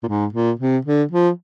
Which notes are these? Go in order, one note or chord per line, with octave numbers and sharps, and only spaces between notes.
A#2
G#2
A#2
C3
D3
F3